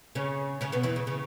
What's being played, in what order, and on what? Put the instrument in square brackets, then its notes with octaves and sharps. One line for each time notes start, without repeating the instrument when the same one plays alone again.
[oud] C#3 C#4
C#3 C#4
B2 B3
E2 E3
C#3
C#3